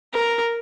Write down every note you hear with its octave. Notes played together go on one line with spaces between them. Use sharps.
A#4